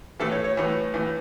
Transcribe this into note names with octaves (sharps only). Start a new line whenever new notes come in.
A2 E3 A4
C#5
C#5
A2 E3
A2 E3